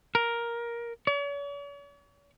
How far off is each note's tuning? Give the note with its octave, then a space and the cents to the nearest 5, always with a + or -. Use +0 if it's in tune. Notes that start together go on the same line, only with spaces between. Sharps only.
A#4 +10
C#5 +45